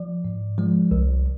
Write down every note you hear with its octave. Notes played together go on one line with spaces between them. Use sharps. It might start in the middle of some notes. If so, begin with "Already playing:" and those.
Already playing: F3 D5
G#2
F3 G#3
C2